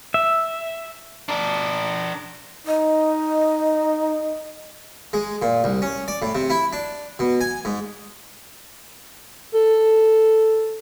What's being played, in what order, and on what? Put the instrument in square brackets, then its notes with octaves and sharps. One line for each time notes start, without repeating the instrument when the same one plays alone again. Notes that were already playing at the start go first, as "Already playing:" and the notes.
[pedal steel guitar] E5
[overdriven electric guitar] D4 A#4
[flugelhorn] D#4 [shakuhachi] D#5
[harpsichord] G#3
A#2
C2
C#4
D5
A2
C3
E4
D4
B2
G#5
G#2
[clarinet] A4